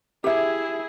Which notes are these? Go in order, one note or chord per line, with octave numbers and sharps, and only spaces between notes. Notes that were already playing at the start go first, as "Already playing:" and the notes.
E4 G4 G#4 E5